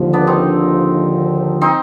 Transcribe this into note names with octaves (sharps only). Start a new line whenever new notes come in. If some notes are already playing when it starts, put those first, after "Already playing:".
Already playing: D#2 D3 F3
B3 D4
C4 D#4
C4 D#4